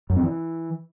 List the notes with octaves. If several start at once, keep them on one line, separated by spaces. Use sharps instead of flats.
F#2
C4
E3